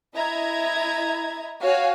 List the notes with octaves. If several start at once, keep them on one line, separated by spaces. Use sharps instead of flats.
E4 D#5 E5 A#5 G#6
F#4 C#5 F5 G#5